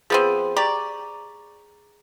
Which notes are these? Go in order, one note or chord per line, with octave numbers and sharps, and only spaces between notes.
F3 B3 C4 G#4 D#7
G4 D5 A#5 C#6